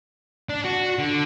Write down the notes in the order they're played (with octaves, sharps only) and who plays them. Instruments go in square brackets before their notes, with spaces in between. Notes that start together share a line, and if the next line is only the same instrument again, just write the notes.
[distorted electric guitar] D4
F#4
D3